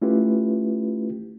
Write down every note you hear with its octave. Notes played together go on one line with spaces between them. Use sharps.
A3 C#4 E4 F4 G4 B4